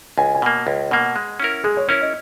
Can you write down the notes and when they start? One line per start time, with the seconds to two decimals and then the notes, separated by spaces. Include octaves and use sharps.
0.18 C#2 G#5
0.34 G#5
0.42 B2 A#3
0.67 C#2
0.91 B2 A#3 F#5
1.16 G#3
1.40 C#4 E4 A#4
1.64 G#3 G#4
1.77 C#5
1.88 C#4 E4 A#4 C#5
2.01 D#5